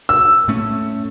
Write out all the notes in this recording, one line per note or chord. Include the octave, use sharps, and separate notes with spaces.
E6
A2 A3 C#4